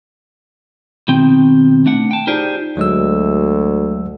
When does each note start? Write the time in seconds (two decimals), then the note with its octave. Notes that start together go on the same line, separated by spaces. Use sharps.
1.08 B2 D#3 C4 G5
1.86 A3 D4 F#5
2.11 G5 A5
2.27 D#4 F4 G4 G#4 C5 D5
2.77 D2 F#3 G#3 E6